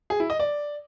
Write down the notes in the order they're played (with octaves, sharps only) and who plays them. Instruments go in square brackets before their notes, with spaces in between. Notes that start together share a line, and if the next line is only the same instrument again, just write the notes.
[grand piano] G#4
E4
D#5
D5